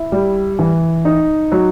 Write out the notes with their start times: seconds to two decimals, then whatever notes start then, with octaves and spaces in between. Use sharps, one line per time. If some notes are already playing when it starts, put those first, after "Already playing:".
Already playing: E4
0.12 G3
0.59 E3
1.05 D#4
1.52 F#3